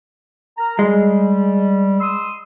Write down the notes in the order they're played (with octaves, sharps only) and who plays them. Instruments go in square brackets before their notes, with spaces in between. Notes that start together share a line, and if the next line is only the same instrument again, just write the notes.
[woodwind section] A#4 A#5
[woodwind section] G3 [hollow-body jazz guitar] G#3
[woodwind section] C6 D#6 E6